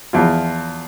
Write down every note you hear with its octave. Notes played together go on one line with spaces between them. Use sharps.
E2 F3 E4 F4